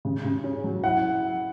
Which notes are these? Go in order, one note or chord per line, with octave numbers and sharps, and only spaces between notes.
C#3
C#3
C#4
F#3
E4 F#5